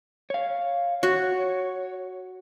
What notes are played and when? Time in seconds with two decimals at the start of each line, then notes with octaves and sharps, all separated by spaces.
0.30 C#5 F5
1.03 F#4 C#5